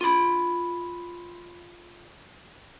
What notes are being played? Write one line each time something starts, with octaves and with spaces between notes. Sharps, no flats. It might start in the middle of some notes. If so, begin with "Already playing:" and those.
F4 B5